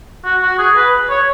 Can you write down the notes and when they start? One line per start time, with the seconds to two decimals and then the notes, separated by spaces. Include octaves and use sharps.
0.25 F#4
0.42 F#4
0.58 G#4
0.76 B4
1.10 C#5